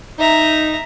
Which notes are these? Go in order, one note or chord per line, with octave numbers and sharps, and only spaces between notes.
D#4 E5 A#5